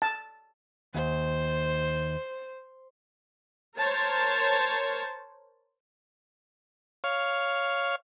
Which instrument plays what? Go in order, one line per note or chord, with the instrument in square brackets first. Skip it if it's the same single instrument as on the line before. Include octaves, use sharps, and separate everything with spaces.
[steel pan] A5
[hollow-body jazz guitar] D#2 [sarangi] C5
[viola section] A#4 C5 C#5 A5
[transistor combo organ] C#5 F5